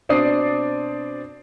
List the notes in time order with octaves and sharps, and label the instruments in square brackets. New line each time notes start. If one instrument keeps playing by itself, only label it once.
[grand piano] B2 C4 D4 D5 D#6 C7